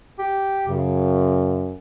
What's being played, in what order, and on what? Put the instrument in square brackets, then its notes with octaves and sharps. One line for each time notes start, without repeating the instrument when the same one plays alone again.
[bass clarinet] G4
[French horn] F#2 [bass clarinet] C#3